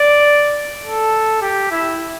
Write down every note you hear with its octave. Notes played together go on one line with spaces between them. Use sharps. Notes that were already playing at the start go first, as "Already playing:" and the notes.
Already playing: D5
A4
G4
E4